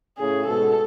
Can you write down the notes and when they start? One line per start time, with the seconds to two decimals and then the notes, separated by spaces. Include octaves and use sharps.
0.18 A2 C#3 G#4
0.46 G#2 B2 A4